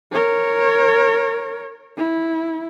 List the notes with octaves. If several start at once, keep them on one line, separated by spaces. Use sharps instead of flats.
A#4 C#5
E4